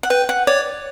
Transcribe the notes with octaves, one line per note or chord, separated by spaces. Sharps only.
F#5
B4 G5
F#5
C#5 D5